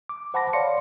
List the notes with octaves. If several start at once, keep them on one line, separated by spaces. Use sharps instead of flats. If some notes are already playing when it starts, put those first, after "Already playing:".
D6
C5 F#5 A5 B5 D6 A#6
C#5 D5 F5 C6 C#7